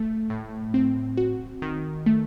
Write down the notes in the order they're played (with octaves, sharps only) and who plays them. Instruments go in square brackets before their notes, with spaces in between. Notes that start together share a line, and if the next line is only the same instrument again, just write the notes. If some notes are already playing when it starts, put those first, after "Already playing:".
Already playing: [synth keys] A3
A2
C4
F#4
D#3
A3